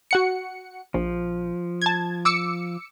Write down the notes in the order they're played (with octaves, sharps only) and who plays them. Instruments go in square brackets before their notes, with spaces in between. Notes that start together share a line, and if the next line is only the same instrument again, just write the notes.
[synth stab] F#4 F#5 C#7
[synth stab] A#1 [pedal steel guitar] F3
[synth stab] A5 G#6
D6 E6 C#7